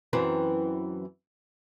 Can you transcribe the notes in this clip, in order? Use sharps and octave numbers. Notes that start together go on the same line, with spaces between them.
F#2 E3 C4